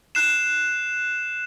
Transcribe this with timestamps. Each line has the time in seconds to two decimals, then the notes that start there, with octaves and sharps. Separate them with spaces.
0.15 F#6 C7 E7